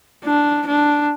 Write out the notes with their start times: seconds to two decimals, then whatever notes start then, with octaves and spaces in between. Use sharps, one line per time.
0.25 D4
0.67 D4